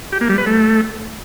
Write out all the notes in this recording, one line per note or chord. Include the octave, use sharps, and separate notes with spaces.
G4
A#3
G3
B4
A3